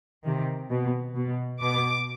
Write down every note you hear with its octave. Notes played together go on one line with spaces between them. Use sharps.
C3 D#3
B2
B2
B2 D6